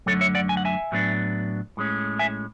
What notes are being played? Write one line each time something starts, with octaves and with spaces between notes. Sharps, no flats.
F#2 D3 F#3 A3 A4 C#5
C#5 E5
D5 F#5
G#5
F#5
E5 G#5
A2 F#3 B3 D4
A2 G#3 C#4
E5 G#5